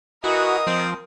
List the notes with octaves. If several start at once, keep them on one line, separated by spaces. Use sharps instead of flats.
E3 F#4 A#4 D#5 D#6
F3 C4